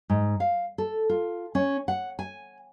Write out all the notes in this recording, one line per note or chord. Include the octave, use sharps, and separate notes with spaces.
G#2
F5
A4
F4
C#4
F#5
G#5